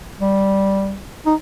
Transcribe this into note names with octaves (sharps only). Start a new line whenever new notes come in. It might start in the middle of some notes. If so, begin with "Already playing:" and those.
G3
D#4